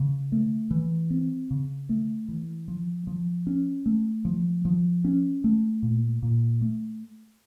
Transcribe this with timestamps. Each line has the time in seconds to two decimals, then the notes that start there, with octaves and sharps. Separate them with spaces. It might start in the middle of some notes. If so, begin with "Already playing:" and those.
Already playing: C#3
0.32 A3
0.71 E3
1.10 C4
1.51 C#3
1.89 A3
2.28 E3
2.68 F3
3.07 F3
3.47 C#4
3.86 A3
4.25 F3
4.65 F3
5.05 C#4
5.44 A3
5.82 A#2
6.22 A#2
6.61 A3